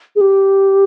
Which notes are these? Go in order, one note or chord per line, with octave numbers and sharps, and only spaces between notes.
G#4
G4